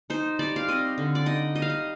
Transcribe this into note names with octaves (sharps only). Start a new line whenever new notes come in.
D#4 C5
G3 D5
F5
C4 D#5
D3
D5
D#4 D#5
G3 D#5
F5
D#5